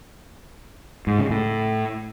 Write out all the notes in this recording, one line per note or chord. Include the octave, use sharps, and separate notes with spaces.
G#2
C#3
A2